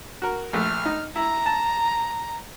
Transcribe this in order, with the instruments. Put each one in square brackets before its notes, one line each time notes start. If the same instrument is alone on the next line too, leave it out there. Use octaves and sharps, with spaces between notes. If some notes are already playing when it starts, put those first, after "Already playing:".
[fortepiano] F#4 A#4
[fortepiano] A#1 A3 [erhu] F6
[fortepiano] D#4
[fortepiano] E4 [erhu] A#5
[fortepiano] A5